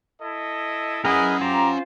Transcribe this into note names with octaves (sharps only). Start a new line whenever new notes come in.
E4 A4 D#5
C#4 E4 G#4 A#4 B4 D#5 F#5
F4 G4 C5 A#5